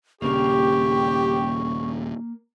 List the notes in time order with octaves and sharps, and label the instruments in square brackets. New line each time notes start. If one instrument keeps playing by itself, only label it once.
[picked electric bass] D#1 C#3 [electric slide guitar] A#3 A#4 [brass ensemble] G4 [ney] C#6